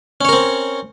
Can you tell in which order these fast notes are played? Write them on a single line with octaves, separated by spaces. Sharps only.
C#4 C#5 A#4 C4